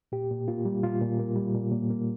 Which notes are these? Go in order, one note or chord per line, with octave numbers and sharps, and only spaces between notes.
A#2 G4
A#2
A#3 F4
G3
A#2 F4
A#2
A#3
G3
A#2
A#2
A#3